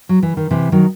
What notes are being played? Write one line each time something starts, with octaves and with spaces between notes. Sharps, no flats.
F#3
E3
D#3
C3 E3
D#3 F#3